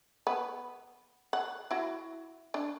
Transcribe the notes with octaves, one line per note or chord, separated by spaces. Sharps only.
B3
F#5
E4 F#4
D4